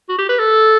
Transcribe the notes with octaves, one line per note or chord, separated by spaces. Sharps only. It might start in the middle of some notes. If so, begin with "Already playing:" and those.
F#4
G4
B4
A4